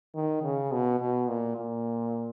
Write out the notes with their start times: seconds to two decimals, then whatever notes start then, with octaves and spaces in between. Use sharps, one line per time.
0.15 D#3
0.43 C#3
0.72 B2
1.00 B2
1.28 A#2
1.57 A#2